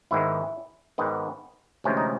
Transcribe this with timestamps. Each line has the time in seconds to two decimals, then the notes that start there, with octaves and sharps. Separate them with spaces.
0.11 G#1 G#2 D#3 G#3 B3 E4
0.98 G#1 G#2 D#3 G#3 B3
1.84 D2 C3 E3 G#3 C#4
1.97 D#4